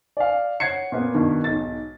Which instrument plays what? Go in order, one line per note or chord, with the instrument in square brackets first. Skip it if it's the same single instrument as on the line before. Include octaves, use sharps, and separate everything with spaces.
[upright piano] D5 F5
C#5 F#5 G#6 C7 C#7
A#2 B3
G2 B2 D#3
B1 G#2 A6